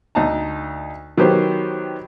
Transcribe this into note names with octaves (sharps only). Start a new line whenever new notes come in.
D2 D#4 A5 A#5
D#3 F#3 B3 G4 C5